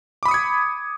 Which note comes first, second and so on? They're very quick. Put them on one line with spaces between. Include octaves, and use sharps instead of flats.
D6 B5 D#6 C#7 G#6